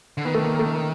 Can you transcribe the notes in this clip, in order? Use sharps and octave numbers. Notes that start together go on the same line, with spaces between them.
D3
D#3 B3
A3
A#3
A#3
A3